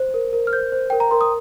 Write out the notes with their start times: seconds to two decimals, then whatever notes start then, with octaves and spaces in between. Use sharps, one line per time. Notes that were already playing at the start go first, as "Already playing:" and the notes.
Already playing: C5
0.14 A#4
0.33 A#4
0.47 F6
0.53 C5 G6
0.72 C5
0.90 A#4 G5
1.00 A#5
1.11 A#4 C6
1.21 D#6